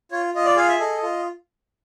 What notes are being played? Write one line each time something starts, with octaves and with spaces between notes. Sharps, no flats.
F4 C#5
F4 D#5
D5
G#4 F5
E5
A4 D#5
F4